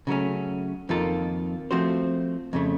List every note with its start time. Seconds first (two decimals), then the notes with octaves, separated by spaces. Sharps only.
0.07 C#3 F#3 A3 C#4
0.89 F2 D#3 A#3 F4 A4
1.71 F3 A3 C4 F#4 C5
2.53 F2 C#3 A3